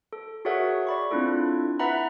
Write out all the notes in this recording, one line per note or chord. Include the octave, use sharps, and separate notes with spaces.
A4
F#4 G#4 A#4 C#5 E5 F#5
D5 B5 C#6
C4 D4 E4 F4 A4
E4 B4 E5 F#5 A#5 B5